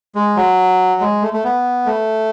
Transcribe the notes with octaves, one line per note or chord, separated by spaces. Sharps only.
G#3
F#3
G#3
A3
A3
B3
A3